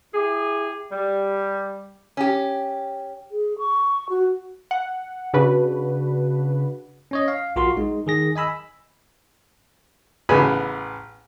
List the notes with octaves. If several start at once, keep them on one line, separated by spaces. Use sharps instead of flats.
E4 G4 G#4
G3
C#4 G4
G#4
C#6
F#4
F#5
C#3 D4 F#4 B4
C#4 C#5 D#5
F5
A#1 F4 F#4 A#4 C6
G#3 D#4
D#3 G#4 A#6
D#5 G#5 B5 E6
A1 C#3 B3 G#5 B5